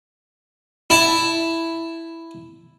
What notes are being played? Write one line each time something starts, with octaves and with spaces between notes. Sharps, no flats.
E4 A5